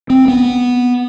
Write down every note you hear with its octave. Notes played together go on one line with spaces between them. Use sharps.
C4
B3